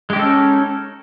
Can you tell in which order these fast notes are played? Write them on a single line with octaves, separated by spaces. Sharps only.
G#3 G4 D#4 A4 C#4